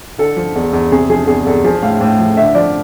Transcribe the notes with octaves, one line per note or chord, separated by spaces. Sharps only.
D3 A4
F3
E2
E2
C3 G#4
F3 G#4
E2 G#4
E2 A4
F3 G#4
A2 F5
A2
F3
D3 E5
F3 D5